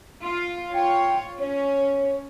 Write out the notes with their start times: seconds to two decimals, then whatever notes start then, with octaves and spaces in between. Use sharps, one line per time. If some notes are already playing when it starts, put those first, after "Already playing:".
0.23 F4
0.73 F4 C#5 G5
1.39 C#4 C#5